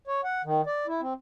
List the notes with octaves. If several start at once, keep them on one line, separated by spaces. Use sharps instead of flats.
C#5
F#5
D#3
D5
E4
C4